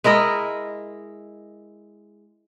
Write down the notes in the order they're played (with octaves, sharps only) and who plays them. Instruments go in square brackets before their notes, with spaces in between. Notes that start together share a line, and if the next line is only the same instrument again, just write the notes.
[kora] G#3 E4 A#4 D#5